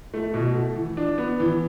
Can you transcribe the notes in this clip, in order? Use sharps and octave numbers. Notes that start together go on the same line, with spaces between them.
A3
B2
A3
E3
D4
B3
E3